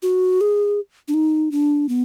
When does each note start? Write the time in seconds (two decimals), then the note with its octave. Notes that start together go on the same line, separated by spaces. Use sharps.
0.03 F#4
0.41 G#4
1.08 D4
1.14 D#4
1.52 D4
1.89 B3